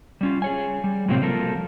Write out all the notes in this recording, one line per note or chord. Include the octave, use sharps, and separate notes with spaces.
G3 C#4 F4
G#4 C#5 G#5
G3
A2 C3 F#3 A#3 C4
F3 F#3 A#3 F4 A4 A#4